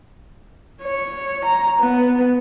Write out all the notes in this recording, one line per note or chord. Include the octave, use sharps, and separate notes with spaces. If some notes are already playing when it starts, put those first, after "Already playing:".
C#5
A#5
B3